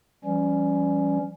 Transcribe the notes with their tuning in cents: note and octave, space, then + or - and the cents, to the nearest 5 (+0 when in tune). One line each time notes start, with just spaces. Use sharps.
E3 +45 G3 +0 C#4 +10